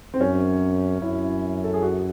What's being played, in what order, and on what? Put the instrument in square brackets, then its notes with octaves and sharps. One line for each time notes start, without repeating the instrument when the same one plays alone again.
[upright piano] C4
[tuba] F#2 [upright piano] C#4
[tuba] F#2 [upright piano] E4
[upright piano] A4
G#4
F#4